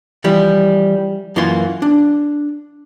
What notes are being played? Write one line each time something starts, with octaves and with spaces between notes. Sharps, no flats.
E3 F3 G3
F#2 E3 A#3 F4 C6
D4